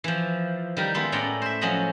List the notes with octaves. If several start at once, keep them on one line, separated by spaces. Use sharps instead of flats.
E3 F3
D#3 G3 A#4
G#3 B3 E4 F4
A2 C#4 D5 F#5 G5 A#5
C5 E5
F3 F#3 C#4 D#5 F#5